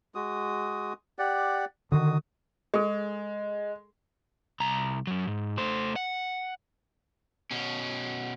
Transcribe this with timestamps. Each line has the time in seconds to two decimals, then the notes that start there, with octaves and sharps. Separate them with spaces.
0.15 G#3 F#4 D#6
1.19 G4 D5 F#5
1.92 D3 D#3 F#4 D#6
2.74 G#3 G#4 A4
4.60 C2 A#5
5.07 F#2 F#3
5.27 G#2
5.58 A3 C5
5.96 F#5
7.51 B2 C#4